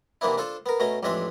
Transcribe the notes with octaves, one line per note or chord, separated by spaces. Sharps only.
C3 E3 A#3 B3 D4 E4
D4 F4 A4 C5
B3 A#4
B2 A3 C#4 A#5
A1 F2 G#3 C4 D4 E5